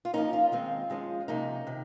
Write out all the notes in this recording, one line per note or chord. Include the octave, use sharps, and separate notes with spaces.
F4
F3 A#3 C#4 D#4
F4
D#3 G#3 C4
F3 G#3 C#4
C3 F3 A#3 C#4 D#4
C3 D#3